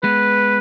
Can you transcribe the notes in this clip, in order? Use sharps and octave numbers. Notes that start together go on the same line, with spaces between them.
G#3 B3 B4